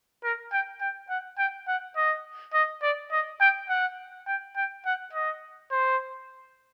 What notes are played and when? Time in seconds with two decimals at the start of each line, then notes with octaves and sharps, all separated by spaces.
0.24 A#4
0.53 G5
0.81 G5
1.10 F#5
1.39 G5
1.68 F#5
1.96 D#5
2.54 D#5
2.83 D5
3.12 D#5
3.41 G5
3.69 F#5
4.27 G5
4.56 G5
4.85 F#5
5.13 D#5
5.71 C5